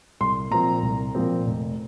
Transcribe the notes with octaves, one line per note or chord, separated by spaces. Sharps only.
C2 C6
A#2 F3 C4 A#5
C2
A#2 F3 C4
F1